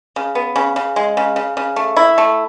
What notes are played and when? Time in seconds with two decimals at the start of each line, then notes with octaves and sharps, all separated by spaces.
0.16 C#3
0.35 B3
0.56 C#3
0.76 C#3
0.96 G#3
1.17 C#3
1.36 C#3
1.57 C#3
1.76 A3
1.97 E4
2.18 A3